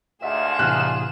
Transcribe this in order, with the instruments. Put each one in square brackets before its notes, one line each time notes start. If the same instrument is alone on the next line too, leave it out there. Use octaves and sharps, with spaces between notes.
[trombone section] D2 G#2 F4 [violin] G#4 E7 [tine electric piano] D#5 E5 F#5
[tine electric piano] A2 C3 E3 [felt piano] F6 F#6